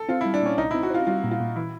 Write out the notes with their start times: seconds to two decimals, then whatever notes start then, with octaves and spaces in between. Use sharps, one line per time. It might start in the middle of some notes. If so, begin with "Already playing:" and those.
Already playing: A4
0.09 C4 F4
0.21 E4
0.26 G3
0.34 D4
0.42 A#2 C#4
0.58 C2 D#4
0.71 E4
0.74 C4
0.83 F#4
0.90 C4 F4
1.07 G3 F4
1.24 A#2
1.31 F4
1.40 A#2
1.56 E3 E4